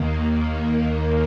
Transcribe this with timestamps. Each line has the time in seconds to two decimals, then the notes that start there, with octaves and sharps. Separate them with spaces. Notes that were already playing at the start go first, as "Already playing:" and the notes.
Already playing: D#2 D#3 A#3